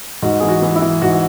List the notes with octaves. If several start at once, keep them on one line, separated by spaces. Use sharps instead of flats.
G#2 F#4
E3 G#4
F#4
E3
E4
E3
G#2 F#4